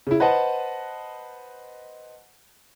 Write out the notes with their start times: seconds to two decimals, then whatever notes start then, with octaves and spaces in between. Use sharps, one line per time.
0.07 C#3 E4
0.20 B4 C5 D#5 F#5 A5